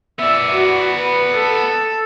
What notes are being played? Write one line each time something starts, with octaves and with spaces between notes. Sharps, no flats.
B3 D5 E5
F#4
B4
A4